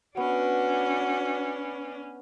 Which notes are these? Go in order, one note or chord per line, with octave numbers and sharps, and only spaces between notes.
B3 C#4 D4 F#4